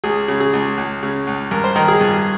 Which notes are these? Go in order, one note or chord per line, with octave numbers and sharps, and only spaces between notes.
C#2 G#4
C#3
G#4
C#2
C#2
C#3
C#2
G2 A#4
C5
D#3 A#4
G#4
G2